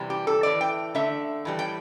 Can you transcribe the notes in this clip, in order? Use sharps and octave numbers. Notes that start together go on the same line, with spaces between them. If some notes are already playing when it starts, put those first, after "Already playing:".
Already playing: C3 E3 G3
G4
A4
A2 E3 A3 D5
G5
D3 A3 E5
A2 E3 G3
G5